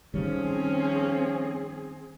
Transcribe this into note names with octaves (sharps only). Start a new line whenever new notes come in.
D#3 F3 G3 C4 C#4 G#4